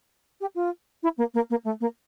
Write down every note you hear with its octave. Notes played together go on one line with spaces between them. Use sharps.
G4
F4
E4
A#3
A#3
A#3
A3
A#3